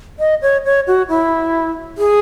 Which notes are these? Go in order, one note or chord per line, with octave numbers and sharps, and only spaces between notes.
D#5
C#5
C#5
F#4
E4
G#4